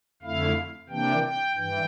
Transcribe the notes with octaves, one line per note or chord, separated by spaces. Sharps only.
F2 D3 A3 E4 F5
C3 E3 A#3 D4 G5
G5
G2 E3 G5